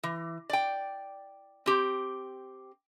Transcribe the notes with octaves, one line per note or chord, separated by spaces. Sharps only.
E3
D5 G5
C4 G4